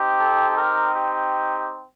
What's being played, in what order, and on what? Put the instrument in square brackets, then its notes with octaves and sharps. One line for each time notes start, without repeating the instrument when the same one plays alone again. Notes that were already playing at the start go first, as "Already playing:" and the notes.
Already playing: [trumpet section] C4 D#4 G4
A4
G4 A#4
G4